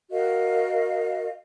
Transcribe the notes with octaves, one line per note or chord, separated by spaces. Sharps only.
F#4 A#4 D#5 F5